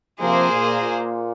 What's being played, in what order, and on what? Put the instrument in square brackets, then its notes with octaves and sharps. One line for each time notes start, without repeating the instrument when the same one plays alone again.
[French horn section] C3 F3 [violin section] A#3 G#4 C5
[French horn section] A#2
A#2